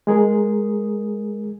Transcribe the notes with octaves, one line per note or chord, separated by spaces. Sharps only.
G#3 G#4 A#4